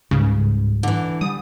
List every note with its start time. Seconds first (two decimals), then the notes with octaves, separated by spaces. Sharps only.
0.11 C#2 G#2 C#3 G3
0.83 D3 E3
1.21 G3 D#6